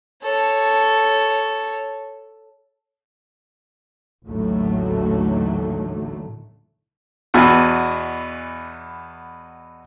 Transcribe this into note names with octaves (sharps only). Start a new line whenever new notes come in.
A4 C#5
A1 D#2 A2 D3 F#3 A3
E2 B2 E3